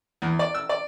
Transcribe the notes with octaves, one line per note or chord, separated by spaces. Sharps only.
E2
D5
E6
D5